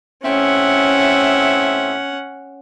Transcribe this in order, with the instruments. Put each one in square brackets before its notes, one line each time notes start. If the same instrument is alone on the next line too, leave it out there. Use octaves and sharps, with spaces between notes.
[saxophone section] A2 C4 E5 [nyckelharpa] C#4 F#5